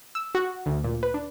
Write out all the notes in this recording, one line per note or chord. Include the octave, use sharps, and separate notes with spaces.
E6
F#4
D2
A#2
B4
D4